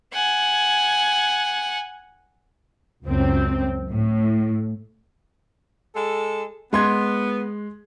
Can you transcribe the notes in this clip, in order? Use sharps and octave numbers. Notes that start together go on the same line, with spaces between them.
F#5 G#5
C#2 F#2 C4
A2
G#3 A4
G#3 B3 C6 G#6